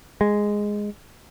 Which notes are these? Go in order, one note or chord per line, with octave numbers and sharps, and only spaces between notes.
G#3